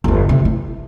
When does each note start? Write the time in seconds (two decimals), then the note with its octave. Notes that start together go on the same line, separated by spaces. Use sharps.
0.04 G1 E2
0.29 C3
0.45 E4